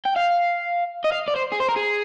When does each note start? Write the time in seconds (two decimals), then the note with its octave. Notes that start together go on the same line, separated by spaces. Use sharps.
0.06 G5
0.16 F5
1.04 D#5
1.12 F5
1.28 D5
1.36 C5
1.52 G#4
1.60 C5
1.69 A#4
1.77 G#4